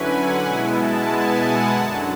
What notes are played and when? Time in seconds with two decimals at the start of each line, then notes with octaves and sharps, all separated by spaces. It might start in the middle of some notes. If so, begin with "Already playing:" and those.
Already playing: D3 F#3 C#4 E4 B4 G#5
0.10 F#5
0.42 B2 G#3 B3 E4 G#5
0.74 A5
1.05 G#5
1.37 F#5
1.69 F#2 D3 F#3 A5